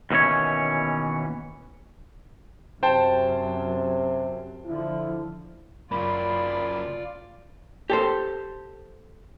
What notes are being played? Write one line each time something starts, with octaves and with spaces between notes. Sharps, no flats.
D#2 B2 E3 C#4 C#5
F#2 C3 C5 G5 A5
D3 F3 E4
F#2 C#3 A#3 F4 D5 B5
G4 A4 C5